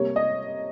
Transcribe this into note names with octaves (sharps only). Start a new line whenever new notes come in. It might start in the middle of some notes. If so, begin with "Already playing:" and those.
Already playing: C3 G3 A#3 C#5
D#5